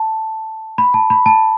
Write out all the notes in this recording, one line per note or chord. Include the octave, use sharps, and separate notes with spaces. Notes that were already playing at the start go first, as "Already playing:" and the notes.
Already playing: A5
B5
A5
B5
A5